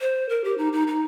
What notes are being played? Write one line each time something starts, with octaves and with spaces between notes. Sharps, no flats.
C5
A#4
G4
D#4
D#4
D#4